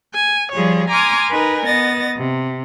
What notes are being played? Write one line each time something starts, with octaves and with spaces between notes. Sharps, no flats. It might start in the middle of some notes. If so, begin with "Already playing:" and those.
G#5
F3 G3 G#4 C#5
G#5 A#5 C6 D6 D#6 F6
D#4 A#4 B4 G#5
B3 D#5 A6 A#6
C3